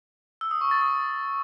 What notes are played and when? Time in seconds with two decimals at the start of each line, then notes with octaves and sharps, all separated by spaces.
0.41 E6
0.51 D#6
0.61 C#6
0.71 A6
0.81 D#6